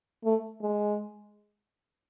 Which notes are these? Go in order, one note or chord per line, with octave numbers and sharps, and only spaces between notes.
A3
G#3